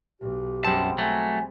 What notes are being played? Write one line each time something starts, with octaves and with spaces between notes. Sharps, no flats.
B1 G4
F#2 G3 G#3 C4 A5
F#3 A3 G#5